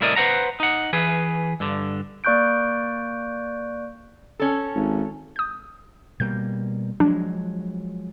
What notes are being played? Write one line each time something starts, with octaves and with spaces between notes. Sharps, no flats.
C2 A2 E4 A#4 D5 D#5
B4 C5 F#5 A#5
D#4 F#5
E3 G#4 B4
G2 D3
A#3 D5 C#6 F#6 G6 D7
C#4 A4
G#1
D#6 G6
B2 G3 A#3 G6
F3 F#3 G#3 D4